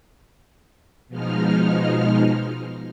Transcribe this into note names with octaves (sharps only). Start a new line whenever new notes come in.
B2 F3 G#3 D#4 F6